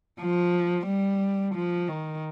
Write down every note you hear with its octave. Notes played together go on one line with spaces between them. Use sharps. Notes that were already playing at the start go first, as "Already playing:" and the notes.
F3
G3
F3
D#3